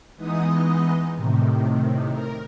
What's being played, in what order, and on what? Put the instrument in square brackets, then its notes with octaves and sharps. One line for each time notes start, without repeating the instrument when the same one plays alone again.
[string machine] E3 G#3 B3 D#4 D#5
A2 C3 D#3
A#4